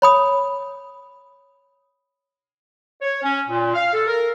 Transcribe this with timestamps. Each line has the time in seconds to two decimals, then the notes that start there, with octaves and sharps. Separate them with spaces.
0.02 C#5 B5 D#6
3.01 C#5
3.23 C#4
3.47 A#2
3.74 F5
3.93 A4
4.07 A#4